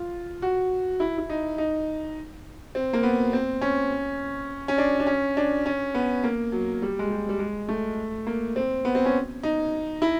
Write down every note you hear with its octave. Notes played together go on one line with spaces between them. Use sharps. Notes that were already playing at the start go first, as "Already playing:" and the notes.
Already playing: F4
F#4
E4
E4
D#4
D#4
C4
A#3
B3
C4
C#4
C#4
D4
D4
C#4
D4
C#4
B3
A#3
F#3
G3
G#3
G3
G3
G#3
A3
A#3
C4
B3
C4
C#4
D#4
E4